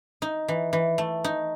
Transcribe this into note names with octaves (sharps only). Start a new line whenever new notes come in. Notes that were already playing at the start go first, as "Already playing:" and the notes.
D#4
E3
E3
A3
D#4